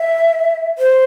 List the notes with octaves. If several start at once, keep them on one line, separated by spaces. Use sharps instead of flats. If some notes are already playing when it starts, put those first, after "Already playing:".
Already playing: E5
C5